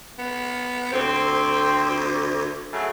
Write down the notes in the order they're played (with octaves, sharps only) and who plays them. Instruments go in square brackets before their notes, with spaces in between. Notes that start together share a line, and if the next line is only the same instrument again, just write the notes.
[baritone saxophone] B3
[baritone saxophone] D2 [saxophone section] C4
[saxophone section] C#3 F#3 A3